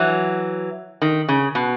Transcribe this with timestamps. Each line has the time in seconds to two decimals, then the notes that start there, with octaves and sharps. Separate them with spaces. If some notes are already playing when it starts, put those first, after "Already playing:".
Already playing: E3 F#3
1.02 D#3
1.28 C#3
1.55 B2